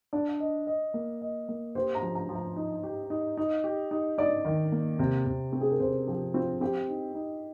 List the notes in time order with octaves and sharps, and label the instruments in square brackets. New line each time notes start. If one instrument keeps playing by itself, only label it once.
[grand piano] D4 [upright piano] D5
[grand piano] D#5
D#5
A#3
D#5
A#3
[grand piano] G4 [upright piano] C5
[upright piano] A#5
[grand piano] F3
[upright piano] A#5
[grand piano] F3
[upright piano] A#5
[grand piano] D#4
G4
D#4
D#4
G4
D#4
[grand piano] D#4 [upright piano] D5
[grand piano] D#3
A#3
C3
C3
[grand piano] C4 [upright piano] G4
[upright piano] G#4
A#4
[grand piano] C3 [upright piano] C5
[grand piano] F3 [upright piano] G4
[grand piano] C4 [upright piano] F4
[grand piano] C4 [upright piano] G4
[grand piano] D#4
D#4